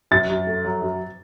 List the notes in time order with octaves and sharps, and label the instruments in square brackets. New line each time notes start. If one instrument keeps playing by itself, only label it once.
[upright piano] F#2 [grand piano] A6
[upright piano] F#2
A3
F#3
F#2